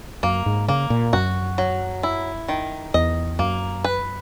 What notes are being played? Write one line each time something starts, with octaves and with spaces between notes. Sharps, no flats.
F#2 A#3
G#2
C#3 A#3
A#2
F#2 F#4
F#3
E4
D#3
E2 D#5
F#2 A#3
B4